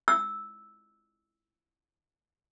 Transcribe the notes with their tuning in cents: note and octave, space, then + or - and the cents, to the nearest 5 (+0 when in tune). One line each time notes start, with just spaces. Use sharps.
E6 -5